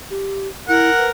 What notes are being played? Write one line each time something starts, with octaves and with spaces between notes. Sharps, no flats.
G4
E4 A#4 F#5
B4